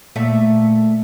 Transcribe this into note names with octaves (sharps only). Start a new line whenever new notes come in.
A#2 A3 E5